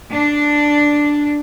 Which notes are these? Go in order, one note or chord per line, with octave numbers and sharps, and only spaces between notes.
D4